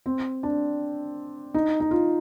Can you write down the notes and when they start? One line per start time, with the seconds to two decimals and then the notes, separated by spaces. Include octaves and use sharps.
0.06 C4
0.43 D4
1.54 D#4
1.80 D#4
1.91 F4